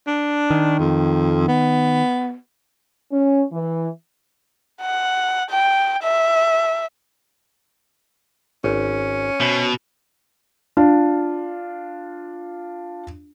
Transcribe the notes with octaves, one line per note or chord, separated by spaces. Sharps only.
D4
D#3
F2
B3
C#4
E3
F#5
G5
E5
G#1 C#4
B2 C5 E5
D4 F4